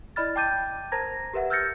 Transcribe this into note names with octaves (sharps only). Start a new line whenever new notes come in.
E4 D5 D#5 B5 F6 A6
G5 A5 D6 G6 A6 D#7
A#4 C5 A5 A#5 G#6 A#6
G4 A#4 B4 E5 F#5
E6 F6 G6 A6 A#6 C#7